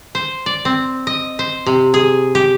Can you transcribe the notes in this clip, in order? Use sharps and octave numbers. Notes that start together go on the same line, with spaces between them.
C5
D5
C4
D#5
C5
C3
G#4
G4